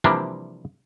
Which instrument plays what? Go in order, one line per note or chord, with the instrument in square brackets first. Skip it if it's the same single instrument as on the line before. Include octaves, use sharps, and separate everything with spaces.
[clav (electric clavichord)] C3 E3 F3 G3 A#3 D4